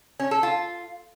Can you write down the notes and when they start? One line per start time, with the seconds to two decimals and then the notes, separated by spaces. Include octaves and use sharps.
0.20 C#4
0.31 A4
0.43 F4